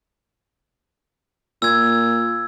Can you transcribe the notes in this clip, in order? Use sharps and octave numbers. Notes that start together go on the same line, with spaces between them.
A#2 E6 G#6